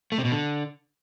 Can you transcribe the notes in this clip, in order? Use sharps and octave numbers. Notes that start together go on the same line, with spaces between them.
A3
C3
B2
D3